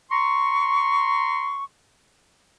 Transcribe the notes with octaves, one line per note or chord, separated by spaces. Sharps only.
A#5 C6 C#6